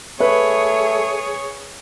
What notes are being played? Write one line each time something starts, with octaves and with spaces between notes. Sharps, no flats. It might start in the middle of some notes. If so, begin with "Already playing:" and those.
A3 G#4 B4 C#5